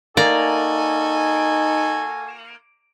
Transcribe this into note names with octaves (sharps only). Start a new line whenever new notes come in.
A#3 D#4 F#4 A4 D5 G#5 A#5